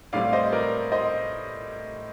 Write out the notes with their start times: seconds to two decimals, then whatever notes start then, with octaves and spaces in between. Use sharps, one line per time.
0.13 A2 G3 C4 D5 F5
0.33 C5 D#5
0.52 A#4 D5
0.92 C5 D#5